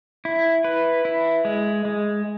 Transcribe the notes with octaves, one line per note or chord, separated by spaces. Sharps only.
E4
B4
E4
G#3
G#3